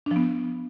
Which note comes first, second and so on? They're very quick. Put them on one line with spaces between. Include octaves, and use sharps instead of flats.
D4 F3 B3